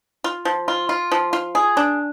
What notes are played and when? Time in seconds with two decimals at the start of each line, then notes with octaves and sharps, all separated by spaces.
0.24 F4
0.45 F3
0.68 F4
0.89 F4
1.12 F3
1.33 F4
1.55 G#4
1.77 D4